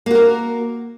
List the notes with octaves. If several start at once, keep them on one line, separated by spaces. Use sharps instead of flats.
A#3 F#4 A#4